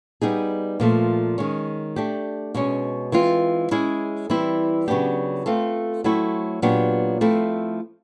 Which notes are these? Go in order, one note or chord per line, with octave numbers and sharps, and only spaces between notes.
G3 B3 D#4 G#4
A#2 F3 A3
D#3 G#3 C#4
A3 D4 G4
B2 G#3 C#4
E3 G#3 C4 F4
G#3 C#4 E4 G#4
E3 G3 C4 E4
C#3 F#3 B3 D4 G4
A3 C4 F4 A4
F#3 A3 C4 E4
A#2 F#3 B3 D4 G4
F3 A3 C4 E4